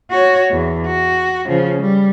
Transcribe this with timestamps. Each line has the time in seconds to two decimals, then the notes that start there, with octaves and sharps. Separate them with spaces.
0.11 F#4 C#5
0.52 E2
0.86 F#4
1.46 C#3 F3
1.81 G3